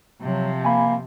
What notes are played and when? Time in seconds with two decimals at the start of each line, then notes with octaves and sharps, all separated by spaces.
0.21 C3 F3 F#3
0.65 A#3 G#5 B5